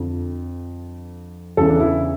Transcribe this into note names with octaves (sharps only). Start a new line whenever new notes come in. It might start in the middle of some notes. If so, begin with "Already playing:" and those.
Already playing: F2 D3 F3
E2 C#3 E3 A4
D4
E4